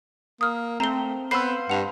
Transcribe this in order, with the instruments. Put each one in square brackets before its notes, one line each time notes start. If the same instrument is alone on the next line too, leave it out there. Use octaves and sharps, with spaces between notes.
[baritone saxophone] A#3 [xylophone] D#6 F6
[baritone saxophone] A3 [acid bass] C4 [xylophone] A#5 G7
[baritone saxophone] B3 [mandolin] B4 C5 F5 [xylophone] E6 C7
[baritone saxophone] G2 [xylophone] F#5 F7